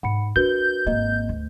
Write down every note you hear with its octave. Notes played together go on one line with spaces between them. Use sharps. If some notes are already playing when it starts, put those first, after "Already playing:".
G#2 F#5 B5 C#7
D4 F#4 A#4 B4 G6
G#1 A#3 D#5
D2